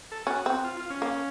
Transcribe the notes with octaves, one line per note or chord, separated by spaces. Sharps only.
A4
C#4 F#4
C4
F4
F4
C#4
A#3